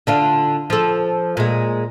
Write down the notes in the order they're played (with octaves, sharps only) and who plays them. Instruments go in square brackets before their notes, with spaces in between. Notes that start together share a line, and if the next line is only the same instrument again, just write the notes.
[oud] D3 D4 F4
F3 A4
A#2 G#3